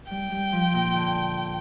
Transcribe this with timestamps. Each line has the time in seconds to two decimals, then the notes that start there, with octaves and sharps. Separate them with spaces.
0.11 G3 G5
0.31 G3
0.52 F3
0.74 A#2
0.94 D3